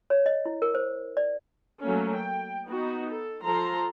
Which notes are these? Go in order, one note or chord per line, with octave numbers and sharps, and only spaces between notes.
C#5
D#5
E4
A#4
C5
D5
F#3 A3 A#3 C#4
G5
B3 D#4 F#4
A4
F3 A4 A#5 C6